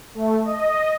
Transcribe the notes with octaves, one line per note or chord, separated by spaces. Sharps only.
A3
D#5